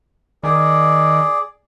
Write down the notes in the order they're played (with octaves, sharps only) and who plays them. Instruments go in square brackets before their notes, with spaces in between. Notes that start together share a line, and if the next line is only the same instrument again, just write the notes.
[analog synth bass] D#3 [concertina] G#4 D5